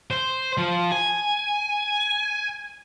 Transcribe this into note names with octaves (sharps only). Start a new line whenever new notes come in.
C5
F3
G#5